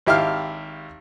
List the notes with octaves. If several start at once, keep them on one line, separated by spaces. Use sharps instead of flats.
G#1 E4 G4 E5 F5 F6